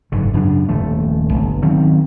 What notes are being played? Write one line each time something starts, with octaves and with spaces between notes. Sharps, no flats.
F#1 G#2 D3
F#2 C#3 D4
D#1 F3 A3
G1
D#3 F#3 C4 C#4